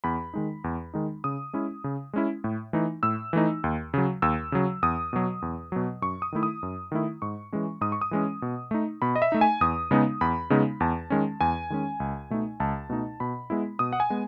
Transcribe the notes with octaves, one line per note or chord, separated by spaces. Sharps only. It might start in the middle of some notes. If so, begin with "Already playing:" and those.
E2 B5
D#3 G#3 D#4
E2
D#3 G#3 D#4
C#3 D#6
G#3 C#4 E4
C#3
G#3 C#4 E4
A2
E3 A3 D#4
A2 E6
E3 A3 D#4
D#2
C#3 F#3
D#2 E6
C#3 F#3
E2 D#6
B2 F#3
E2
B2 F#3
F#2 C#6
D#6
D#3 A3 E4
D#6
F#2
D#3 A3 E4
G#2 C#6
E3 G#3 C#4
G#2 D#6
C#6
D#6
E3 G#3 C#4
B2
A3 D#4
B2 B5
D#5
E5
A3 D#4
G#5
E2 D#6
C#3 G#3 B3 D#4
E2 B5
C#3 G#3 B3 D#4
E2 A5
D#3 G#3 C#4
E2 G#5
D#3 G#3 C#4
C#2
B2 A3 D#4
C#2 A5
B2 A3 D#4
B2 B5
G#3 B3 E4
B2 D#6
F#5
G#5
G#3 B3